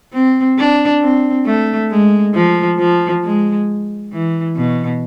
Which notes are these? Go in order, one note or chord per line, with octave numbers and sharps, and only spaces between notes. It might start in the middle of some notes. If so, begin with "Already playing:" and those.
C4
D4
C4
A3
G#3
F3
F3
G#3
E3
B2